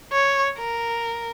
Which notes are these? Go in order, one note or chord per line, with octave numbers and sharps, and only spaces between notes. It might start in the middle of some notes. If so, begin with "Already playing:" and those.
C#5
A#4